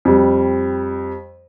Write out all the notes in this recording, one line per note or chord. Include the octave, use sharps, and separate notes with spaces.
F2 G3